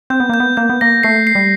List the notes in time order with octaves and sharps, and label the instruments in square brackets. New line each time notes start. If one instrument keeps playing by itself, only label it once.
[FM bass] C4 [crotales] G6
[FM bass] B3
[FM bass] A#3 [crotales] G6
[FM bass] B3
[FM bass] A#3 [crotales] G6
[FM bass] B3
[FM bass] A#3 [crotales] A#6
[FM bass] A3 [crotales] C7
[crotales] C7
[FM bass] G3